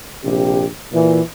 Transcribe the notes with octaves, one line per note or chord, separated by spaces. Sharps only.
A#1 C3 G4
A#2 E3